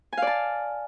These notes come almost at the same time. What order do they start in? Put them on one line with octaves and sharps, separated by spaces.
G#5 F5 D5 A5